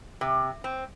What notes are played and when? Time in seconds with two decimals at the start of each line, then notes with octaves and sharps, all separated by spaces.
0.21 C3
0.64 C4